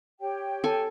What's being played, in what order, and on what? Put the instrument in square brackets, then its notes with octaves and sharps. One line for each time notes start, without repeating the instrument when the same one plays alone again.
[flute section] G4 C#5 G5
[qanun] A4 G#5